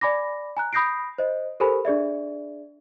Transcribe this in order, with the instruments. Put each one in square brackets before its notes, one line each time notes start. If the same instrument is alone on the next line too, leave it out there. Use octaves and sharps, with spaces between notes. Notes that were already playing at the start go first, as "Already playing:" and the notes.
[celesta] D5 G#5 B5 D6 A#6
G#5 A#5 F#6
B5 D#6 G6 A#6 C7 D7
C5 D#5
G4 A4 A#4 C5 G#5 B5
D4 G#4 D5 E5